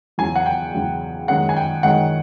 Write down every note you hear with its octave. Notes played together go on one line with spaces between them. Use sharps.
E2 C#3 F#3 G#5
F#5
G5
E2 C#3 F#3
F#2 D#3 G#3 C#4 F#5
G#5
G5
F#2 D#3 G#3 C#4 F#5